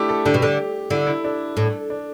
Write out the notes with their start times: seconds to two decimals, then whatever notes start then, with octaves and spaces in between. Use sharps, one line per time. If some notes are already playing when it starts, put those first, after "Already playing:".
Already playing: A3 D4 E4 G4
0.09 A4
0.25 D3 G4
0.34 B2
0.42 D3
0.90 D3 E4
1.07 E4
1.24 D4
1.57 A2
1.90 D4